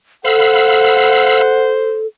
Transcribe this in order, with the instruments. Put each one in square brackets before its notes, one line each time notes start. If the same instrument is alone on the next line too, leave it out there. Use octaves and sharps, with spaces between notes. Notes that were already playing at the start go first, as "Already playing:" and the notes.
[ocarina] A4 [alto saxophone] C5 [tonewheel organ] F5 B5 E6 [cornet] F#5